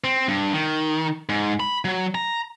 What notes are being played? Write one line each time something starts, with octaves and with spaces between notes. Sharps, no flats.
C4
G2
D#3
G#2
B5
F#3
A#5